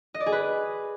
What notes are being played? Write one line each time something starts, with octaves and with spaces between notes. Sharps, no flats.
D#5
D5
G#4
B4